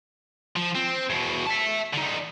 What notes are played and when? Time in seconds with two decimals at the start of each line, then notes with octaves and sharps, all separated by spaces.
0.56 F3
0.75 C4
1.10 E2 B2
1.46 E5 A5
1.93 D3 D#4